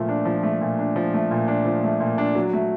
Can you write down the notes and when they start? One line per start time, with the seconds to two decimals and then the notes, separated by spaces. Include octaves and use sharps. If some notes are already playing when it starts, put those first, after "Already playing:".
Already playing: A#2 F3 A3
0.09 D4
0.25 F3
0.43 A3
0.61 A#2
0.79 D4
0.96 F3
1.14 A3
1.31 A#2
1.48 D4
1.65 F3
1.84 A3
2.00 A#2
2.18 D4
2.35 F#3
2.53 A3